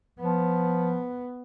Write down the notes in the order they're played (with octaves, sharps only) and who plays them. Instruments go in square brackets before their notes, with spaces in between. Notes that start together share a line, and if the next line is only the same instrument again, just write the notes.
[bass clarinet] F3 [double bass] B3